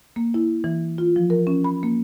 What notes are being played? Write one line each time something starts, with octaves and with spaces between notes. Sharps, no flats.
A#3
E4
E3
F4
F3
A#4
C#4
B5
A#3